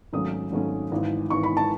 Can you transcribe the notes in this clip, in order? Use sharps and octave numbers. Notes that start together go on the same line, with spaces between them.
G#1 G#2 F#3 A3 C#4 D#6
G#1 G#2 F#3 A3 C#4
G#1 G#2 E3
G#1 G#2 E3 C#6
B5
A5